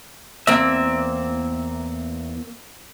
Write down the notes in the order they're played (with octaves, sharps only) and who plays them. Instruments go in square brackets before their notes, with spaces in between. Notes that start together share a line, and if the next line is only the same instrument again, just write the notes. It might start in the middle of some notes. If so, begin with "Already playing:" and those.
[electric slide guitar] E2 E5 [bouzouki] A#3 C4